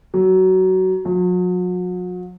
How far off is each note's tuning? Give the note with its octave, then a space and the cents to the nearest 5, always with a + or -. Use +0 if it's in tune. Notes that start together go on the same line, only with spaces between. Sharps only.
F#3 +20
F#3 -40